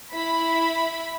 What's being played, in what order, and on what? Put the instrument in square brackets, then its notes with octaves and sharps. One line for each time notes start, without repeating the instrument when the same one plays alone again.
[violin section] E4 B5